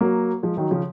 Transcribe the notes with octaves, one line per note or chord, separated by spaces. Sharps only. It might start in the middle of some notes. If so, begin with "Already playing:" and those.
F#3 A#3
F3 G#3
D#3 F#3
C#3 F3